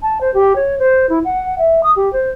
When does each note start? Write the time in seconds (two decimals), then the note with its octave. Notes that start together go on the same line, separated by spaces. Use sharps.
0.02 A5
0.21 C5
0.34 G4
0.56 C#5
0.79 C5
1.09 E4
1.24 F#5
1.58 E5
1.83 D#6
1.96 G4
2.13 C5